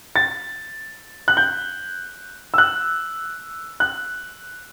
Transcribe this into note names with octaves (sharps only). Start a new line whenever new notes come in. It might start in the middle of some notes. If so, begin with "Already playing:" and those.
A6
F#6
G6
E6
F#6
F#6